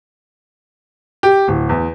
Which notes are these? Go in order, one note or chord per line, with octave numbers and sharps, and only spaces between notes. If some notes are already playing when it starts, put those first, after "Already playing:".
G4
D1
E2